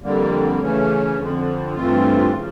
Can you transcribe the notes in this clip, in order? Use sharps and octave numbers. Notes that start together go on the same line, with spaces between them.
F2 D3 G3 A#3
C#3 E3 A3 C#4
F2 D3 F3
G2 E3 A3 C4 F4
C#3 F3